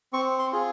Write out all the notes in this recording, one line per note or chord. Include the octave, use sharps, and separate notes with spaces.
C4 C#6
C6
F4 G#4